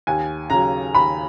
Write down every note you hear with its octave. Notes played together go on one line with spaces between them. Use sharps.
D#2 G#5
C#3 F#3 A#5
D#2 B5